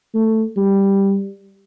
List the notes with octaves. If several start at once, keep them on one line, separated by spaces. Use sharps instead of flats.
A3
G3